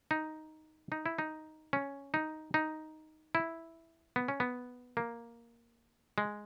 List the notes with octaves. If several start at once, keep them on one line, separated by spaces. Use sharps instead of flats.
D#4
D#4
E4
D#4
C#4
D#4
D#4
E4
B3
C#4
B3
A#3
G#3